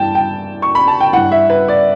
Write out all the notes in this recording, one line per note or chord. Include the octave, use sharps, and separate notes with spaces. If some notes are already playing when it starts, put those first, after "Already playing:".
Already playing: G2 E3 G5 A5
G5
C#6
B5
A5
G5
G2 E3 F#5
E5
B4
D5